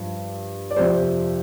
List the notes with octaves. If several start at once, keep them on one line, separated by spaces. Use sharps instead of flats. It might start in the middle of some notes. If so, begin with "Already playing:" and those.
Already playing: G2 F3
D5
F2 C3 F3 C5